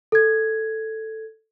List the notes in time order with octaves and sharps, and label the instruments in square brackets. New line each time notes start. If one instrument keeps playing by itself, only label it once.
[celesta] A4 G#6